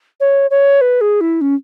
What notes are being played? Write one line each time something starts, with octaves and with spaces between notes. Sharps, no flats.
C#5
C#5
B4
G#4
E4
C#4